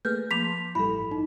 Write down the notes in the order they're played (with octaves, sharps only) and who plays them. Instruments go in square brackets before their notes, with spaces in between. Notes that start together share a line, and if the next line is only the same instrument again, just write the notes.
[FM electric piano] A3 A#3 G#4 [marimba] B4 F6 [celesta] G6
[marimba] F3 A#3 D6 [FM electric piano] A5 B5 C6 [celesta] B6 F7
[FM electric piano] A1 E4 [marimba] G2 G3 A4 [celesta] B5
[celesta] D#4